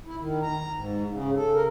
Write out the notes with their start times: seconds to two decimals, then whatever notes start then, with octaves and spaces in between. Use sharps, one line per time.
0.06 E4
0.20 D#3
0.43 A#5
0.75 G#2
1.09 C#3
1.35 A4
1.54 A#4